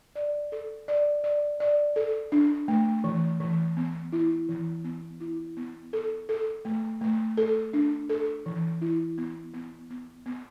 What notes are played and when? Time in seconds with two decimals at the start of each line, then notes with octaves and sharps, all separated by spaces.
0.15 D5
0.52 A4
0.88 D5
1.24 D5
1.60 D5
1.96 A4
2.32 D4
2.68 A3
3.04 E3
3.40 E3
3.77 B3
4.12 E4
4.49 E3
4.84 B3
5.20 E4
5.57 B3
5.93 A4
6.29 A4
6.65 A3
7.01 A3
7.37 A4
7.73 D4
8.09 A4
8.46 E3
8.81 E4
9.18 B3
9.54 B3
9.90 B3
10.26 B3